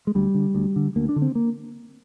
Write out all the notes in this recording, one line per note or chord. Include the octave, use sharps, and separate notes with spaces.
G#3
D2 G3
D3
D2
D3
D2 A#3
D4
D3
C4
A#3